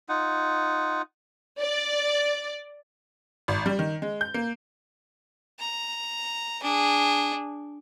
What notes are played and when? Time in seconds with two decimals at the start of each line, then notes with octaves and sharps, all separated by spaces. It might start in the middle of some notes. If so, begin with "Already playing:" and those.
0.09 D#4 F4 F#5
1.60 D5
3.48 G#1
3.66 G3
3.79 D#3
4.02 G#3
4.21 G6
4.34 A#3
5.60 A#5
6.62 D4 G#4